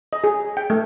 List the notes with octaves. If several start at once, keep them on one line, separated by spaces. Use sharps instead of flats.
D#5
G#4
G5
A3